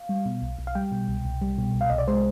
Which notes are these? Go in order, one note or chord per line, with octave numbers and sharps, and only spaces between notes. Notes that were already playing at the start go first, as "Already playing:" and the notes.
Already playing: F5
G3
B2
B1
B1
F5
G3 G5
B2
C2
C2
G3
B2
C2
F5
C2 D#5
D5
G#3 C5